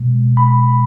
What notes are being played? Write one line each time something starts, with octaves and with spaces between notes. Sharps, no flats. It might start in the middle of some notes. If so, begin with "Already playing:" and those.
Already playing: B2 G#3
B5